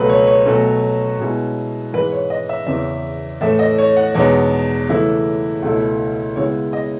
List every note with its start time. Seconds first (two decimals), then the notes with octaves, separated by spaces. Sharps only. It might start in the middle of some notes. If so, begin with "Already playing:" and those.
Already playing: C#2 B2 F#3 A3 B4
0.09 C#5
0.27 C#5
0.46 B2 F#3 A3 C#4
1.20 B2 G#3 C#4 E4
1.93 G#2 E3 G#3 B4
2.12 C#5
2.30 D#5
2.49 E5
2.67 E2 C#3 E3 E5
3.41 A2 E3 A3 E5
3.59 D#5
3.78 C#5
3.96 F#5
4.14 E2 B2 G#3 B3 D#4 C#5
4.89 C#3 E3 A3 E4
5.62 C#2 B2 A3 E4
6.36 C#3 G#3 B3 E4 C#5
6.73 D#5